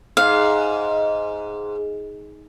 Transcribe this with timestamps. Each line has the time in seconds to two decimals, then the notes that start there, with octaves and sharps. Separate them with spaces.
0.17 G#2 F5